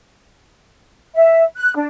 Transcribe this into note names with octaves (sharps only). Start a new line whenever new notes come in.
E5
F#6
D4